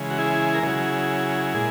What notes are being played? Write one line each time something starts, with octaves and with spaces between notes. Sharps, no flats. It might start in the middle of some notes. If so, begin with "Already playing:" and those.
Already playing: C#3 E3 G#3
F#4
E4 G#4
A#4
C#3 F#3 E4 G#4
A#2 G#3